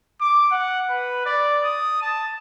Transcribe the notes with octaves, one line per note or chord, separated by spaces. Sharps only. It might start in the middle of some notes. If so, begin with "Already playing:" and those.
D6
F#5
B4
D5
D#6
A5